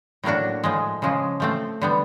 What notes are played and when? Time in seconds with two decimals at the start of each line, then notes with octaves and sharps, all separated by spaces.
0.24 A2 F#3 A#3 D4 F#4
0.64 A2 F3 G#3
1.02 C#3 F3 G#3
1.40 F3 A3 C4
1.82 D3 G3 B3